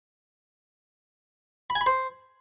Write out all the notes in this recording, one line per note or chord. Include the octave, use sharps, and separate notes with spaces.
B5
G#5
B5
C5